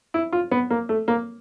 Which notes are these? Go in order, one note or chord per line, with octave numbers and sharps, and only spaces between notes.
E4
F4
B3
A#3
A3
A#3